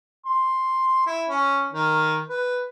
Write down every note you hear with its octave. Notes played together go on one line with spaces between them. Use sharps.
C6
E4
C#4
D#3
B4